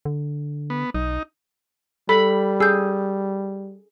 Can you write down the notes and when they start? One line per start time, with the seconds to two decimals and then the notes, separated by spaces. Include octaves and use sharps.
0.05 D3
0.70 B3
0.94 B1 D#4
2.09 G3 A4 B5
2.60 G#4 E6 G6